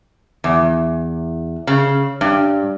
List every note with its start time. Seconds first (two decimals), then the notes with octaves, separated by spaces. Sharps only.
0.44 E2
1.67 C#3
2.21 G2